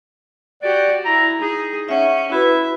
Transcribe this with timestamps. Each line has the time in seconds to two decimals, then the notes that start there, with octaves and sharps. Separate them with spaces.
0.63 F#4 G4 D5
1.06 E4 A#5
1.41 D#4 G#4
1.89 C#4 E5 F#5
2.32 E4 F#4 B4 E5